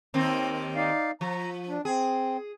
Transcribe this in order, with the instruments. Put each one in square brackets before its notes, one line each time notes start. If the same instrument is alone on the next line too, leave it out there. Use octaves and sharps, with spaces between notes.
[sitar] D#2 D#3 C4
[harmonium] D#4 D5 F5
[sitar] F3 [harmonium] A#5
[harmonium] D4
[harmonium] C4 [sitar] G#4